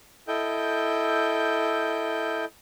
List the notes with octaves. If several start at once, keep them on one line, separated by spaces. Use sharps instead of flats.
E4 A4 D#5 G5 G6